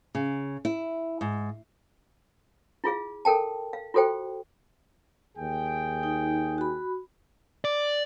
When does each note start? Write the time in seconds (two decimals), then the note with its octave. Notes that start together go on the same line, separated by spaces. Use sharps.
0.15 C#3
0.65 E4
1.21 G#2
2.84 E4 F4 G#4 F5
3.25 A4 A#4 G5 A5
3.73 F5
3.94 F4 F#4 A4 C5 G5
5.38 D#2 G#4 G5
6.03 D#4
6.58 F#4 B5
7.65 D5